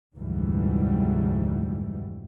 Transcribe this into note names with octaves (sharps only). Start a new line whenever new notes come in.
F1 D2 G#2 E3 F#3 G3